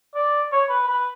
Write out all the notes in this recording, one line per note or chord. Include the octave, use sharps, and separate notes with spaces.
D5
C#5
B4
B4